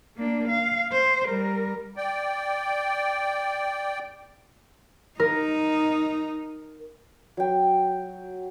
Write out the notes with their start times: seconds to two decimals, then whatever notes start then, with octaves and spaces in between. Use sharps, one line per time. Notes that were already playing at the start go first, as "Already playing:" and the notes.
0.17 A#3 D4
0.49 F5
0.92 C5
1.26 G3 A#4
1.97 D5 G5
5.20 D#4 A#4
7.37 F#3 G5